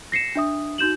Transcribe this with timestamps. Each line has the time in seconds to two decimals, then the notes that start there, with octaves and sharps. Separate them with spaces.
0.12 A#6 C7 C#7 E7
0.35 D4 E5 D#6
0.78 D#4 F#4 G6 E7 F#7